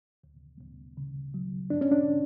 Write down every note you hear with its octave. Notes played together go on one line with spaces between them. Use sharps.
D2
D2
C#3
F#3
G2 D4
C#4
D4